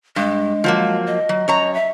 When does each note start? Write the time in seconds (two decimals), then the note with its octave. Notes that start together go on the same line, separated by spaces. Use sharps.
0.16 G2 G#3
0.64 F3 F#3 A#3
1.07 D#5
1.29 F#3
1.48 F#2 C#5 A#5
1.74 E5